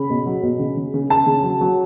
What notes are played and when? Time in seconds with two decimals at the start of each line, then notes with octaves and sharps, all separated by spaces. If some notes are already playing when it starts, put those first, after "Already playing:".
Already playing: C#3 B5
0.10 B2
0.26 F#3
0.43 B2
0.59 C#3
0.77 C#3
0.94 C#3
1.10 C#3 A5
1.27 C#3
1.43 F#3
1.61 F#3